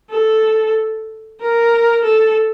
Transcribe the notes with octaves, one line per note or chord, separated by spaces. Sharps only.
A4
A#4
A4